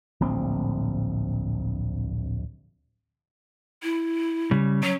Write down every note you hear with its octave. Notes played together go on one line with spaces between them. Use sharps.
D1 A#1 C4
E4
C#3 G3
F#3 C#4